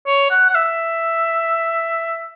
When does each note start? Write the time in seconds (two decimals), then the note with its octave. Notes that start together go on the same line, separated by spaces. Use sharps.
0.06 C#5
0.30 F#5
0.49 F#5
0.55 E5